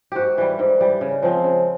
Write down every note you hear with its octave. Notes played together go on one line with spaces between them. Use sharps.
G#2 F#4 G4
E3 G3
G#2
E3 G3
C#3
F3 G#3 C4
C#3